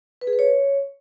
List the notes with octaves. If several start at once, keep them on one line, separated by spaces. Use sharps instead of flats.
B4
G#4
B4
C#5